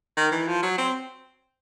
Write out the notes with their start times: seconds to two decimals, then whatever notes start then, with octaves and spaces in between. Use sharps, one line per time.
0.17 D#3
0.32 E3
0.48 F3
0.63 F#3
0.78 C4